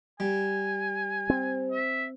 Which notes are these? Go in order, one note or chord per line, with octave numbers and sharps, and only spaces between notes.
G3 G#5
C4
E5